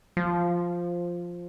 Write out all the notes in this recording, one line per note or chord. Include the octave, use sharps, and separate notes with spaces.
F3